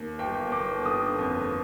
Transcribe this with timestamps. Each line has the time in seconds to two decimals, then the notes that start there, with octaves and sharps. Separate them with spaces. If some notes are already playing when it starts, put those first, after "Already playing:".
Already playing: D#2
0.19 G1 G5
0.52 G1 D6
0.85 D3 D#6
1.19 F2